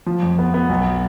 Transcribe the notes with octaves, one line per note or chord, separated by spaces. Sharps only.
F3
F2
B3
B3
B1